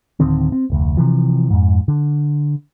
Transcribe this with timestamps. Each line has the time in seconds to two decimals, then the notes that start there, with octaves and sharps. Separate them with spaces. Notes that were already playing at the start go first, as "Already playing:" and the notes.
0.20 D1 D3 D#3 C4
0.52 C4
0.70 F1 D2
0.97 C3 E3 F3
1.50 F2 G#2
1.88 D3